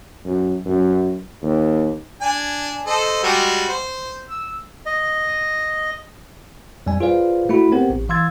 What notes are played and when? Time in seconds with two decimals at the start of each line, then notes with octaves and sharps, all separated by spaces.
0.25 F#2
0.66 F#2
1.43 D#2
2.21 D4 G#5
2.86 A4 C5 D#5
3.23 G3 G#3 F#4
3.68 C5
4.29 E6
4.86 D#5
6.86 F2 G3 D5 G#5
7.00 F4 G#4 B4 C5 D5 F5
7.49 A3 E4 F#4 B5
7.72 B3 C4 G4 A#4 C5 F#5
7.90 A1
8.09 E3 F5 C6 E6 G#6 A6